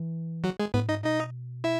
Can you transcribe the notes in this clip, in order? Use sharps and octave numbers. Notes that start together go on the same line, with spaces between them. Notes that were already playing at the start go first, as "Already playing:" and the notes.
Already playing: E3
F#3 F#4
G#3 G#4
A2 B3 B4
G#2 D#4 D#5
B2 D#4 D#5
E4 E5